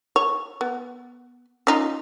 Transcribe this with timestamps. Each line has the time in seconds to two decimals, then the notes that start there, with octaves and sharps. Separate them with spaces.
0.16 C#5
0.61 B3
1.67 C#4 D#4 F4